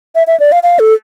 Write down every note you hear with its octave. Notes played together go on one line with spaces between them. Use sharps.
E5
E5
D5
F5
F5
A4